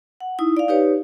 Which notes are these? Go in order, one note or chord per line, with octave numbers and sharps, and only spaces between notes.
F#5
D#4 E4 D#6
D5 F5
D#4 G4 B4 C#5